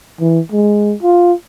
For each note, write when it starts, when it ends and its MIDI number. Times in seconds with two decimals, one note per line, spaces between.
0.20 0.39 52
0.52 0.94 56
1.03 1.32 65